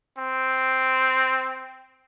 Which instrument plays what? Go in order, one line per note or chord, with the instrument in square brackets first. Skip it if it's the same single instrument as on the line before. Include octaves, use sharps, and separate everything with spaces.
[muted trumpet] C4